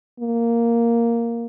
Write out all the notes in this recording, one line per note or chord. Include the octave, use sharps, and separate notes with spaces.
A#3